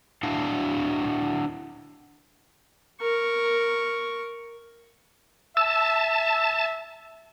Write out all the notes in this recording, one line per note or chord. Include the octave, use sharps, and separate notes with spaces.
D4 E4 F#4 F5
A#4 C#6
E5 A5 E6